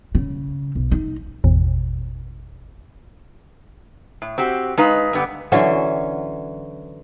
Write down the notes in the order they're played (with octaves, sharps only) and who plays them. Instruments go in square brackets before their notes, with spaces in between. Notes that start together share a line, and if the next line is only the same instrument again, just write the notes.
[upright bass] C#3
B1
D#4
[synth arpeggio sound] G#1 E2 B2
[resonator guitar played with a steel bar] A2
C4 F#4 G4
G#3 D#4 B4 F5
G2 D3 B3 G4
[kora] D3 E3 F#3 C#4